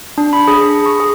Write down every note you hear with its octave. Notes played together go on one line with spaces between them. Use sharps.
D4
B5
G#4
C#6
G#4